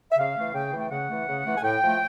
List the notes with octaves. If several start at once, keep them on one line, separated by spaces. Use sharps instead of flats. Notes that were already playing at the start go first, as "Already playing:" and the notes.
E5
C#3 F5
E3 A3
C#3 G5
E3 A3
G5
C#3 F#5
E3 A3
C#3
E3 A3
G#5
A2 G5
F3 A3